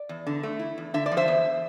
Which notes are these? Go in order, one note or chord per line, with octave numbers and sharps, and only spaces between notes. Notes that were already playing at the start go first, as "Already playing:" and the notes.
Already playing: D5
E2
D3
A3
E4
E2
D3 E5
D5
F3
C5 E5
E2